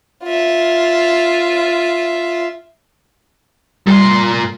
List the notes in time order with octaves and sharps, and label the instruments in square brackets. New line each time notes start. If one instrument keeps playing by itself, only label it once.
[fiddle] F4 E5
[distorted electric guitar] A#2 C6 [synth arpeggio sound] G3